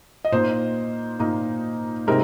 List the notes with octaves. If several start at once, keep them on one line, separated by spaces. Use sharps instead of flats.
D#5
A#2 A#3 D#4 C5
A#2 A#3 D#4
C3 G#3 C4 D#4 A#4